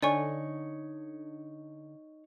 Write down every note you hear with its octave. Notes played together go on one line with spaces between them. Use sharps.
D3 D#4 C#5 D5 G#5 C#6